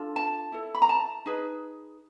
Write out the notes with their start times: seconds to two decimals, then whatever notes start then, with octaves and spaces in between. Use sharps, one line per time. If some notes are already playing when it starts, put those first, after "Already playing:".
Already playing: D4 F4 A4
0.16 A5
0.52 E4 A4
0.75 B5
0.82 A#5
0.89 A5
1.26 D#4 G#4 B4